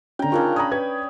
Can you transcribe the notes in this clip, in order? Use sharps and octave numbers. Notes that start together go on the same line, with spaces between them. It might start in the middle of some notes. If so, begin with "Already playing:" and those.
D3 C#4 G5 A#5
C#3 D4 D#4 F4 A#4 C#6
C#5 D5 A#5 B5 D#6
B4 G#6